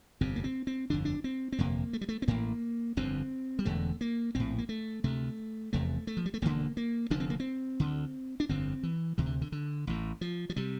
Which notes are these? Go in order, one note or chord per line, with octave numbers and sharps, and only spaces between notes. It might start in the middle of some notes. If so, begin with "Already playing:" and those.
G1 F2 C3 C4
A#3
C4
C4
G1 F2 D3 D4
D4
C4
C4
G1 F2 C3 A#3
A3
G3
A3
C4
A1 A2 A#3
G1 F2 D3 C4
G3
E1 E2 D3 A3
A#3
A#1 A2 C4
A#3
A3
D2 C3 A3
F1 E2 C3 A3
A3
F3
G3
A3
E1 D2 D3 A#3
A#3
F1 F2 D3 D4
C4
A#3
C4
D2 D3
D4
G1 F2 D3 C4
E3
D2 C3 E3
D3
D3
D3
A1 A2
F3
F3
C3 G3